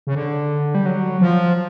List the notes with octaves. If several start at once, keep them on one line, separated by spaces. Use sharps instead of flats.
C#3
D3
G3
F#3
F3